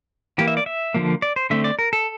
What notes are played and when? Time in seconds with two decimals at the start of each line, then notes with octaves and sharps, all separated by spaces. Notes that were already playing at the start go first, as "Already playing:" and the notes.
0.38 E3 A#3 G4
0.48 E5
0.57 D5
0.66 E5
0.94 D3 F3 A#3
1.22 D5
1.36 C5
1.50 D3 A3 C4 E5
1.64 D5
1.79 A#4
1.93 A4